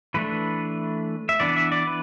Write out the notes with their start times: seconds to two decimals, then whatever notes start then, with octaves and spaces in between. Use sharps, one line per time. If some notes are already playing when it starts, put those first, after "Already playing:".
0.14 E3 A3 D4 B4
1.29 E5
1.40 E3 B3 D4 D5
1.57 E5
1.72 D5
1.87 B4